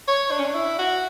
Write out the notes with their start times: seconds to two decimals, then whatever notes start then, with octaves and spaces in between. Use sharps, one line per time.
0.08 C#5
0.31 D4
0.39 C#4
0.45 D4
0.55 E4
0.78 F#4